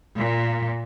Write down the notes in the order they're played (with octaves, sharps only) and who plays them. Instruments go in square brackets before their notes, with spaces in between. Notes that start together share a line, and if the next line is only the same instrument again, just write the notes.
[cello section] A#2